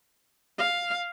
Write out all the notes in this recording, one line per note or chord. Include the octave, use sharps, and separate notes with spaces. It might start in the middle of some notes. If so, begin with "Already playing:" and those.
F5